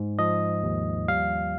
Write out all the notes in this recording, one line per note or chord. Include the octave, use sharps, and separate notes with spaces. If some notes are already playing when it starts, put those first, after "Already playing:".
Already playing: G#2
F3 D#5
D#2
G3 F5